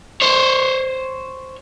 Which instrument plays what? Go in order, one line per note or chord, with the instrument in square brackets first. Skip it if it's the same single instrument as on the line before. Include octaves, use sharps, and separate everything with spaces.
[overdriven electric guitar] C5 C#5